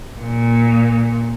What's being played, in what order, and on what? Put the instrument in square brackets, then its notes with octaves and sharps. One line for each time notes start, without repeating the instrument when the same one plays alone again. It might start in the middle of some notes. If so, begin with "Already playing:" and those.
[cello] A#2